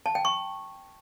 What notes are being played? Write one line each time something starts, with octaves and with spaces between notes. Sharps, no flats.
A5
G5
C#6